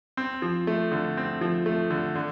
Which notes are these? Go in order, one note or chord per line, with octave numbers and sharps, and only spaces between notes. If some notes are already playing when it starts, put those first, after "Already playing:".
C4
F3
A3
D3
C4
F3
A3
D3
D3